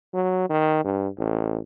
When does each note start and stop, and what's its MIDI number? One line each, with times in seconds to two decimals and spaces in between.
0.14 0.49 54
0.50 0.83 51
0.84 1.08 43
1.18 1.59 33